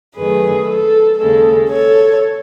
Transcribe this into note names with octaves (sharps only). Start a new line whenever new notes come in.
F#2 D#3 A3 G#4 B4
A4
D#2 C#3 G#3 A4
A4 C#5